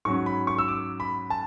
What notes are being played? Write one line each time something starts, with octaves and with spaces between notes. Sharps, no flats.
G#2 F#3 C#4 C#6
B5
C#6
E6
D6
B5
A5